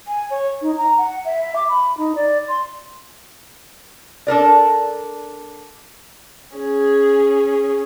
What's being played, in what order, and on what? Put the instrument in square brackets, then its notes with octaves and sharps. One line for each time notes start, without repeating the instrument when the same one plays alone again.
[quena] G#5
C#5
D#4
A#5
F#5
E5
D6
B5
D#4
D5
C6
[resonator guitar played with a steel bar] D4 A4 A#4 D5
[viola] C#4 G#4